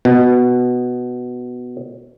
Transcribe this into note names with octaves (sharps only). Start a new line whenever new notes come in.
B2